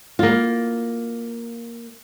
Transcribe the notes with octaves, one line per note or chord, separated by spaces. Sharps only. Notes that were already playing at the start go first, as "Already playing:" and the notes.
A#3 F4